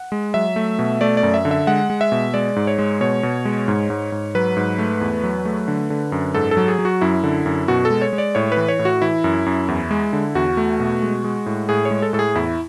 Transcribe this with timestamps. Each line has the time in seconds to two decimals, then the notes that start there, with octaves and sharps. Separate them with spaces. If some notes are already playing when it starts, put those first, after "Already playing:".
Already playing: F#5
0.12 G#3
0.34 F#3 E5
0.56 A3
0.79 B2
1.01 A3 D5
1.17 D5
1.23 F#2
1.34 E5
1.45 D3
1.51 E5
1.67 G#3 F#5
1.90 G#3
2.01 E5
2.12 B2
2.34 G#3 D5
2.56 G#2
2.67 C#5
2.79 G#3
3.01 B2 C#5
3.23 B2
3.45 G#3
3.68 G#2
3.90 G#2
4.12 G#2
4.35 F#3 B4
4.57 G#2
4.78 A3
5.01 E2
5.23 F#3
5.45 A3
5.68 D3
5.90 D3
6.12 F#2
6.34 G#2 A4
6.51 A4
6.57 F#3
6.68 G#4
6.79 F#3
6.85 F#4
7.01 F#2 E4
7.24 D3
7.46 F#2
7.68 B2 F#4
7.85 A4
7.90 G#3
8.02 C#5
8.13 G#3
8.18 D5
8.35 A2 C#5
8.52 B4
8.57 E3
8.68 C#5
8.79 A2
8.85 F#4
9.02 E3 E4
9.24 F#2
9.46 F#2
9.68 E2
9.91 G#3
10.13 D3
10.35 E2 F#4
10.57 A3
10.80 B2
11.02 G#3
11.24 G#3
11.46 A2
11.69 A2 G#4
11.85 C#5
11.91 G#3
12.02 A4
12.13 A2 A4
12.19 G#4
12.35 E2 E4